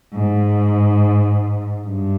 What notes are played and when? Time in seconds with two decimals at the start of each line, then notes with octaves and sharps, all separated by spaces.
0.14 G#2
1.88 G2